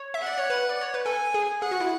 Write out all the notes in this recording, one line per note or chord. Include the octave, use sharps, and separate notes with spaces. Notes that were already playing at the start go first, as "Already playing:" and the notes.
Already playing: C#5
E5
F#5
D5
C#5
B4
D5
C#5
B4
A4 G#5
G#4
G#4 F#5
F#4
E4